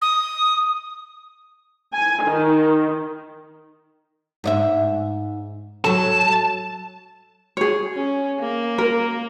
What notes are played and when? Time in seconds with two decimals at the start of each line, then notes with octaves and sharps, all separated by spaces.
0.02 D#6
1.93 G#5
2.24 D#3
4.44 G#2 D#5 E5
5.84 F#3 A4 A5
7.57 G#4 C#5
7.94 C#4
8.39 A#3
8.78 A#4